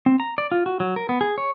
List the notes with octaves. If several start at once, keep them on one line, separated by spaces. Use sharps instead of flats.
C4
A#5
D5
F4
F#4
F#3
A#4
B3
G#4
C#5